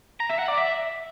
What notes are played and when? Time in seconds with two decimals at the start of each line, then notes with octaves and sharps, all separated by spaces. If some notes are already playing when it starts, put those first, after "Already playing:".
0.20 A#5
0.30 E5
0.39 F#5
0.48 D5
0.58 E5